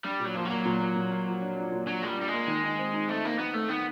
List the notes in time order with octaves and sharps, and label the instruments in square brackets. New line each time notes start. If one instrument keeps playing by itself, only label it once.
[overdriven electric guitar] G3 [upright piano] D4
[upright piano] A#2
[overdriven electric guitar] F#3
[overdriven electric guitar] F3 [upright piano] A#3
[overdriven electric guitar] F#3 [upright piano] A#3
[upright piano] A#2
A#3
A#2
A#3
F3
D4
D4
A#2
[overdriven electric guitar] F#3 [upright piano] D4
[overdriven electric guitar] G#3 [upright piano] A#3
[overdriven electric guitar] G3
[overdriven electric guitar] G3 [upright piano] D4
[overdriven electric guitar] G#3
[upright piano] A#3
D#3
D#4
C4
D#4
[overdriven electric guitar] A3 [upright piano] C4
[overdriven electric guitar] A#3 [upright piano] D#4
[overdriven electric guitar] B3 [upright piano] D#4
[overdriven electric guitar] A3 [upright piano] C4
[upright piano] D#3 [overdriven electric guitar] B3